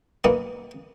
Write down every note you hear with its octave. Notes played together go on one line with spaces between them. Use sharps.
B1 B2 A#3 B3 F#5 D#6